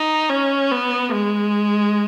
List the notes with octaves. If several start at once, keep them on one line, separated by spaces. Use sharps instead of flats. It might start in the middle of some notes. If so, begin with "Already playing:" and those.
Already playing: D#4
C#4
B3
G#3